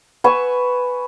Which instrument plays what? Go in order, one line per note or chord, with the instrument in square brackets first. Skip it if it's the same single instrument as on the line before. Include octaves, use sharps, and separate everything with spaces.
[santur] B4 G#5 C#6 E6